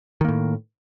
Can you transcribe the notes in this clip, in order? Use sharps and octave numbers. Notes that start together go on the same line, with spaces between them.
A2 D#3 A#3